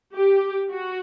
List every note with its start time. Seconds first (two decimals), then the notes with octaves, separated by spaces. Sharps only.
0.15 G4
0.70 F#4